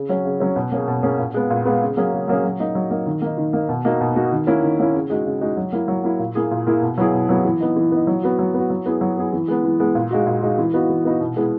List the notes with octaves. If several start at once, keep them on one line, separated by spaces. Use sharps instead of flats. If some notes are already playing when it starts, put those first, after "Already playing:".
Already playing: C#3
F#3 C#4
C#3
F#3 C#4
B2
A#3 C#4 G#4
B2
A#3 C#4 G#4
A#2
G#3 B3
A#2
G#3 B3
C#3
F#3 A#3 C#4 G#4
C#3
F#3 A#3 C#4 G#4
F#3
A#3 D#4
F#3
A#3 D#4
D#3
A#3 D#4
D#3
A#3 D#4
B2
A#3 D#4 F#4
B2
A#3 D#4 F#4
D#3
A#3 C#4 E4
D#3
A#3 C#4 E4
C#3
G#3 D#4 F#4
C#3
G#3 D#4 F#4
F#3
A#3 E4
F#3
A#3 E4
A#2
A#3 E4 G#4
A#2
A#3 E4 G#4
B2
F#3 B3 E4 G#4
B2
F#3 B3 E4 G#4
E3
B3 D#4
E3
B3 D#4
F#3
B3 F#4
F#3
B3 F#4
F#3
B3 E4 G#4
F#3
B3 E4 G#4
E3
G#3 B3
E3
G#3 B3
A#2
G#3 D#4 F#4
A#2
G#3 D#4 F#4
E3
B3 D#4 F#4
E3
B3 D#4 F#4
B2
G#3 B3 E4 G#4